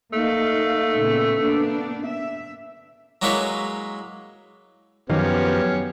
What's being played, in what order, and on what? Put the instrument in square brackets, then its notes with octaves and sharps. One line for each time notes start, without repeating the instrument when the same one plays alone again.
[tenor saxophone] A3 [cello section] A#3 D#4 F5
[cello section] A#2 C#3 B3
A#3 B3 D4
E5
[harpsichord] F#3 G#3 A#3 E4 B4 C#5
[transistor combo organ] F#2 F3 [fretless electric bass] D#3 [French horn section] B3 [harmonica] C#4 G4